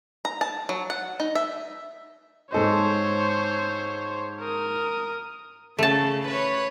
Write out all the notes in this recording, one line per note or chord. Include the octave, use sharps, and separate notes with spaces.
A#5
A5
F#3
F#5
D#4
E5
G#2 A4 C5 C#5 D#5
A#4 D#6
C#3 A3 A5
B4 C#5